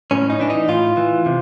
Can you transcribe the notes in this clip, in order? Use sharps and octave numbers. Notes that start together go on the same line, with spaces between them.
A2 C#4
D#4
E3 D4
D#4
A2 F4
E3
C3